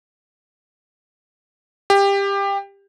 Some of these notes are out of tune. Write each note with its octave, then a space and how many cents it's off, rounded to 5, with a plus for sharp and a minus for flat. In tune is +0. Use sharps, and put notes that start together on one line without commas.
G4 +20